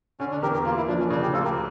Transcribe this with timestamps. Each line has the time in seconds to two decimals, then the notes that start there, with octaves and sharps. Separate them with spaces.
0.20 D3 C#4
0.31 D4
0.42 E2 G4 A#4
0.54 G4 A#4
0.65 A#3 F4
0.77 E4
0.88 F3 D4
0.99 C#4
1.10 C#3 D4
1.22 G4
1.33 D2 F4 A4
1.44 G4 A#4